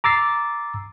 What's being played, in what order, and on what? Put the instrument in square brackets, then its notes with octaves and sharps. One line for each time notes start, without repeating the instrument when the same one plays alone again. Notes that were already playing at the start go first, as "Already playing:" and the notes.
[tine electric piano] A#5 D6 E6 A6 C7